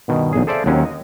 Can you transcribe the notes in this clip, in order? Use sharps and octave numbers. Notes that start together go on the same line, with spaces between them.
G2 B2 D#3
B1 E2 G#4
G#4 A4 C5 D5 E5 F5
D#2 F#3 C4 C#4
D#5